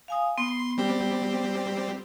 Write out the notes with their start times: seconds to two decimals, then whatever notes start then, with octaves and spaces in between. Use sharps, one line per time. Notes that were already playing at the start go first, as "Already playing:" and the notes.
0.08 F5 G#5 D#6
0.38 B3 C6
0.78 G3 C4 G4